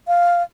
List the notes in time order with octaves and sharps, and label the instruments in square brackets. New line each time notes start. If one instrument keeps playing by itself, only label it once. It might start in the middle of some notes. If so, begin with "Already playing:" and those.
[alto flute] F5